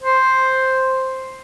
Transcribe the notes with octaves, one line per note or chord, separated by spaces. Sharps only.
C5